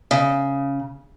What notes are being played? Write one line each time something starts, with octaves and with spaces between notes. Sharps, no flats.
C#3